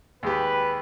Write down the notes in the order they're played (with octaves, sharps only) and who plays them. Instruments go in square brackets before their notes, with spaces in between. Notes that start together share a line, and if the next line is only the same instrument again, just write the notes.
[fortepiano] D#2 G#3 G4 [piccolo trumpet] B4